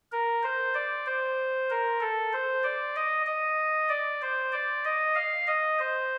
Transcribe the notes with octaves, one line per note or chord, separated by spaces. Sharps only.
A#4
C5
D5
C5
A#4
A4
C5
D5
D#5
D#5
D5
C5
D5
D#5
F5
D#5
C5